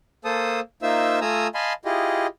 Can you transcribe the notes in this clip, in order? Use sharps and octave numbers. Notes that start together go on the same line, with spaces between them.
A#3 A4 C5 A5 D#6
A#3 D#4 F4 C5 E5 E6
A3 F4 G#5 A#5 D#6 E6
D#5 F5 G#5 A5 B5 C6
E4 F4 G4 G#4 D#5